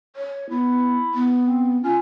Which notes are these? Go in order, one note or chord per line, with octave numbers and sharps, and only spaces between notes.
C#5
B3 E4
B3
C4
C#4 F4